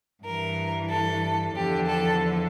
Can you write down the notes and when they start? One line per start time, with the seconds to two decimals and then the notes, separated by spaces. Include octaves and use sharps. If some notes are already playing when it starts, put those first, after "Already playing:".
0.23 G2 E3 A#4
0.89 A4
1.55 E2 D3 F3 G4
1.87 A4